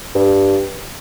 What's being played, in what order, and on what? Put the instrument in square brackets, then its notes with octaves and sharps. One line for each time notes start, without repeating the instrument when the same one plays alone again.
[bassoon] G2